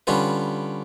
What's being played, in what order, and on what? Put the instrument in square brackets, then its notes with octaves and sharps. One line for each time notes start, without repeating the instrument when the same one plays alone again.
[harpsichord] D3 G3 C#4 F4 B4